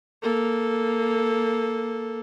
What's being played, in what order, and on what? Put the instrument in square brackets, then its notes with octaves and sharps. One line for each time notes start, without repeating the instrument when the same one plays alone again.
[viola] A#3 A4